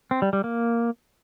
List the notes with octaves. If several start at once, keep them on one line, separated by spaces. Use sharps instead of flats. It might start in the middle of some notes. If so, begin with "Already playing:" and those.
C4
G3
G3
A#3